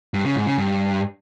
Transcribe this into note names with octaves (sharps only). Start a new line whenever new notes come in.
G2
C#3
G#2
C#3
G2